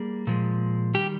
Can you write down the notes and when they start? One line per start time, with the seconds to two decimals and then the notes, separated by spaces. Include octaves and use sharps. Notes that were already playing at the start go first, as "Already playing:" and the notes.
Already playing: G3 A#3 G#4
0.27 A#2 F3 G#3
0.94 D#3 G3 G4